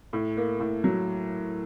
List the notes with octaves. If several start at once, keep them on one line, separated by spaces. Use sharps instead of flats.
A2
A#3
A2
F#3